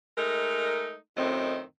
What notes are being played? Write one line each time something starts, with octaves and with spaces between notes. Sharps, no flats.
G#3 A3 D#4 A#4
F#2 A2 D#3 C4 D#5